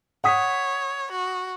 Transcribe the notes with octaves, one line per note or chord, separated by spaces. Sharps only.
C#5 F#5 D#6 B6
F#4